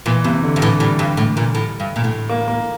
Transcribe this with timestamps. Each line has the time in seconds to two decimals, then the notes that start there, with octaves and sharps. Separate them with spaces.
0.06 A#2 E3
0.24 G2 C3
0.43 D3
0.56 G2
0.62 A2 E3
0.80 A2 G3
0.99 G2
1.17 A2
1.37 A#2
1.55 A2
1.80 G2
1.96 A#2
2.04 A2
2.29 A#3
2.48 A#3